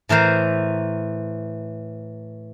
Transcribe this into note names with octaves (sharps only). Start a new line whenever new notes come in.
A2 E3 A#4 C5